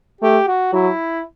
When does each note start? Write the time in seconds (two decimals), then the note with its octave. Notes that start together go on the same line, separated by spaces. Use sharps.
0.21 A3 G4
0.47 F#4
0.73 F#3 E4